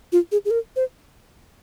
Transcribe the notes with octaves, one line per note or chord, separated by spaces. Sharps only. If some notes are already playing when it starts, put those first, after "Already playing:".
F4
G#4
G#4
A#4
C5